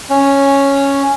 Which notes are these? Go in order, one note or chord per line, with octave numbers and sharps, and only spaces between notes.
C#4